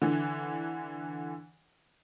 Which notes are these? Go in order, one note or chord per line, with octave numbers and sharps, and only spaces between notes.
D3 E3